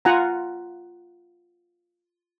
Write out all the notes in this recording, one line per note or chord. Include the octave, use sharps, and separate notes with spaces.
F4 F#5 G#5 A#5